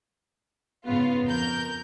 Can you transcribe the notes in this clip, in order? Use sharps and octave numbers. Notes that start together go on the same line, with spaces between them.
G#2 C#3 B3 F4
F2 A#4 G6